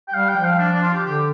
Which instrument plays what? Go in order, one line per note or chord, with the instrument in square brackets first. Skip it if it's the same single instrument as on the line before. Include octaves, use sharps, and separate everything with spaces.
[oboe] G5
[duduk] G3 [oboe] F5
[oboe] G5
[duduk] F3
[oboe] F5
D4
D4
F4
G4
[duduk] D3 [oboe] G4